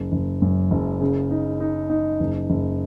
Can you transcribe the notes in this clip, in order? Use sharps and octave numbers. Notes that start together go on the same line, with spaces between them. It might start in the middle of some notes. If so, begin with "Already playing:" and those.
Already playing: F#1
F#1
F#2
F#1
C#3
D#4
D#4
D#4
F#1
F#1